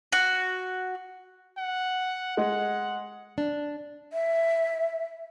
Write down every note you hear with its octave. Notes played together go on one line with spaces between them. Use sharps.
F#4
F#5
G#3 F#5
D4
E5